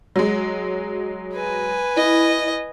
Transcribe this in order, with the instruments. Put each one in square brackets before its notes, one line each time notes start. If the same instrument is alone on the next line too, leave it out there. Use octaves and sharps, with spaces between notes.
[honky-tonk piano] F#3 G#3
[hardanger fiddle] B4 G#5
[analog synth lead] E4 [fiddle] D#5